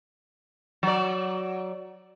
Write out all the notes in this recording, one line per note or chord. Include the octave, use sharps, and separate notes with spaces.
F#3 D5